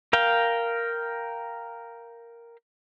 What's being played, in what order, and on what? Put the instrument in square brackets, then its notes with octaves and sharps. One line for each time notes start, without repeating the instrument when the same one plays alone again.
[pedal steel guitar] A#4 F5 G5